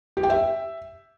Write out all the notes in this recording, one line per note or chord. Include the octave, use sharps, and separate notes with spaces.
G4
G5
E5